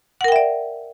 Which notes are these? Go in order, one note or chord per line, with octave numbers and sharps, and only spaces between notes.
A#4 D5 E5 F#5 G5